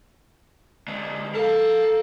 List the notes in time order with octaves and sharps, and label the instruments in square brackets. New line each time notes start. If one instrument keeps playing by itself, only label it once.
[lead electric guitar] D3 G#3
[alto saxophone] A4 [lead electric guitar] A#4 F5